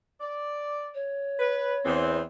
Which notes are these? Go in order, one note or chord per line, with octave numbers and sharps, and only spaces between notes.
D5
C#5
B4
E2 C4